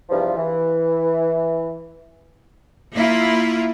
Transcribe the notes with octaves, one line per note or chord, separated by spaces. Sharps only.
E2 G2 C3 E3 F3
E3
A#3 E4 F4